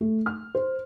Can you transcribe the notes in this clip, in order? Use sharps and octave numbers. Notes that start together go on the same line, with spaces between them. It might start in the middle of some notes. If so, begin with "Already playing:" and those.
A3
F6
C5